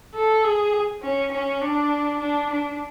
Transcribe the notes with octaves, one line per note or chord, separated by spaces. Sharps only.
A4
G#4
C#4
C#4
D4
D4
D4